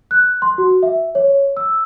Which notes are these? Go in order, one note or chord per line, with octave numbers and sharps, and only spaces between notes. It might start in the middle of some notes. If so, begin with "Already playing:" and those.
F#6
C6
F#4
E5
C#5
E6